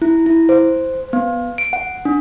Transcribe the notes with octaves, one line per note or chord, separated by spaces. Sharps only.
E4
E4
C5
B3
D7
F#5
D4